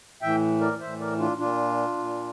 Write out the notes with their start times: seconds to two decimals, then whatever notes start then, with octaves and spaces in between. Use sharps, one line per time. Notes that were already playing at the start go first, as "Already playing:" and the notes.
0.22 A2 E3 E5 G5
0.61 A#4 D5
0.80 A2 E3 C5 E5
0.99 A#4 D5
1.19 D4 F4
1.38 A#2 D4 F4
1.97 A#2